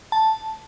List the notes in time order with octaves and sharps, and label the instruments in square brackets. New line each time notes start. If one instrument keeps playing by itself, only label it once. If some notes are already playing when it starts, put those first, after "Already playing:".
[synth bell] A5